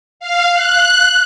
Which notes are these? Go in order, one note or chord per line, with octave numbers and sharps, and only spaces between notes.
F5
F#6